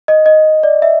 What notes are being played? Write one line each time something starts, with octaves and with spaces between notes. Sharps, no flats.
D#5
D#5
D5
E5